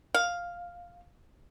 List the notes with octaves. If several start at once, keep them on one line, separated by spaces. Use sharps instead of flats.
F5